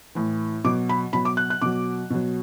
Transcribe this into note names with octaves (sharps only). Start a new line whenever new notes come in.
A2 E3
B2 F#3 D6
B5
B2 F#3 B5
D6
F#6
F#6
B2 F#3 D6
B2 F#3